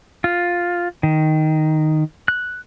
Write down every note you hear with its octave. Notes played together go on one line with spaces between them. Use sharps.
F4
D#3
F#6